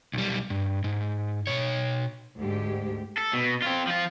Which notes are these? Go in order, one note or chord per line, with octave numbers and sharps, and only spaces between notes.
B1 G3
G2
G#2
B2 C#5
D2 G#2 G4
A4
B2
C4 F4
F3 F4